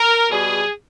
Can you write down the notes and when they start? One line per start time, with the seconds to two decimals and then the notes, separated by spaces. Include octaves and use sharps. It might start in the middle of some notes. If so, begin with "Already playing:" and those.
Already playing: A#4
0.31 B2 G3 G#4